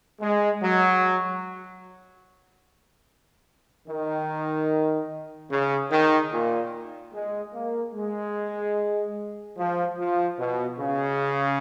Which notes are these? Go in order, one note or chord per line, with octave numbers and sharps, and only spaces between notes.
G#3
F#3
D#3
C#3
D#3
A#2
G#3
A#3
G#3
F3
F3
B2
C#3